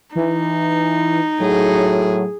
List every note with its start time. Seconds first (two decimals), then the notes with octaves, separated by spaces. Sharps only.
0.15 E3 D#4
1.40 A2 F#3 G#4